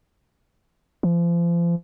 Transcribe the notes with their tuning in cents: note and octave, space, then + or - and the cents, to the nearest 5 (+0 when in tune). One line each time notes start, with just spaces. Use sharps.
F3 -35